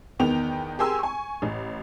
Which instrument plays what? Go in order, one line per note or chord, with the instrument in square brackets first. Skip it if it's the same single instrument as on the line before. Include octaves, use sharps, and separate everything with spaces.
[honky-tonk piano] E2 D#3 B3 G5 F7
G4 G#4 A#4 G#5 C6 E6
G#5 C#6
A1